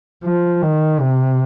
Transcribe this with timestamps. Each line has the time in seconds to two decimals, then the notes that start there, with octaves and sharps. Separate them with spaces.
0.24 F3
0.62 D#3
1.00 C3